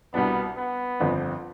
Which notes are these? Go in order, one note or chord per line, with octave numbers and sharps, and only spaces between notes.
C2 B2 G3 B3 D4
B3
G1 F2 D3 F3 C4